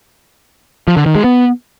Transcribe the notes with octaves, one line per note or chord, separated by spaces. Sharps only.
F3
D3
D#3
G#3
B3